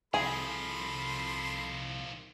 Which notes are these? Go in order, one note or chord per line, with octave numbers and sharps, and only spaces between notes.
C2 D#3 F3 G#4 A4 B5 C6